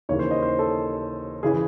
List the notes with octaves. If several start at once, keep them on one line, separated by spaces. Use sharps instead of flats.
D#2 C#3 E3 C#5
C5
D#5
C5
A4
C#3 E3 G#4